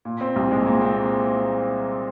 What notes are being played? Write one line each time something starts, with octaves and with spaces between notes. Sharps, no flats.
A#2
C4
C2
G#3
A#2
C4